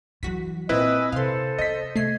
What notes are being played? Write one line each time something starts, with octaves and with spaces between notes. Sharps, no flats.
E3 F#3 F#4 B6
A#2 C4 D#4 E4 B4 D#5 G#5 E6
C3 A4 C5 F5 C6
B3 D#5 B6
C3 A3 G#6 C7